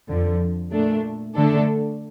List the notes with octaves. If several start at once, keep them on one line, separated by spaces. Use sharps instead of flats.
F2 D3 F3
A#2 A3 D4
D3 A3 D4 A4